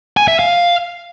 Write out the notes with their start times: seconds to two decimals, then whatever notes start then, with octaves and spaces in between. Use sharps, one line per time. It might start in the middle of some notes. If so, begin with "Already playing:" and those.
0.17 G#5
0.28 E5
0.39 F5